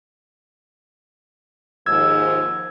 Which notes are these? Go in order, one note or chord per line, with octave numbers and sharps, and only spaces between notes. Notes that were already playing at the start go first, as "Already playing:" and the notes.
D#2 G#2 F3 E6 G#6